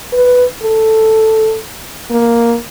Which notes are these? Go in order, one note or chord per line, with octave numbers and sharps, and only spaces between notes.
B4
A4
A#3